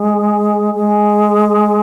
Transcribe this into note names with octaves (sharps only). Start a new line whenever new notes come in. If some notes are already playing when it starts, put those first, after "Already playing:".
Already playing: G#3
G#3